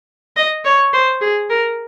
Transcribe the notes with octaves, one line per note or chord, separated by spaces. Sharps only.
D#5
C#5
C5
G#4
A#4